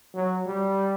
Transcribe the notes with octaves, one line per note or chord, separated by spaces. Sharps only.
F#3
G3